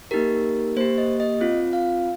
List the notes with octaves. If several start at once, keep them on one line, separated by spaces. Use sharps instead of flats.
A#3 D#4 G4 A#4
A#3 G4 C5
D#5
D#5
C4 F4
F5